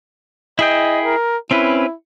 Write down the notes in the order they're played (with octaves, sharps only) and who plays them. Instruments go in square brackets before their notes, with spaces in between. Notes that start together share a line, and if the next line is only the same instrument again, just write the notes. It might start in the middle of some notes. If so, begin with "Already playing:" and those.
[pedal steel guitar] E4 G#4 G5 [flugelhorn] D#5
[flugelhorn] A#4
[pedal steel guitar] C4 C#4 B4 [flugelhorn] E4